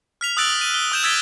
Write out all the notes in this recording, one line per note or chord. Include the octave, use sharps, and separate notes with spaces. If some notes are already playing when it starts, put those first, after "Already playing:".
F6 B6 F7
D#6 E6 F#6 A6 D7 F#7
D#7
G7
D#6 G6 E7
E6 G#6 A6 B6 D7 G7